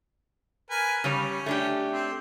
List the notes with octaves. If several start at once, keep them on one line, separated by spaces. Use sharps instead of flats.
A#4 B4 G#5
C#3 G3 C#4 C#5
A3 D4 G4
C4